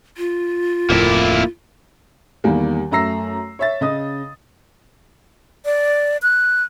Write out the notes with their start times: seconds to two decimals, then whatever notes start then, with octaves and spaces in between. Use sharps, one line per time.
0.17 F4
0.90 D1 F2 A2 A#3 E4
2.44 E2 D#3 G3 A#3
2.92 F#2 A3 A#5 E6 A#6 C7
3.59 C#5 E5 A6
3.81 C#3 D#5 D#6
5.65 D5
6.22 F#6